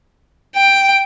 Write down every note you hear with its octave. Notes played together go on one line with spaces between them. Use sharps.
G5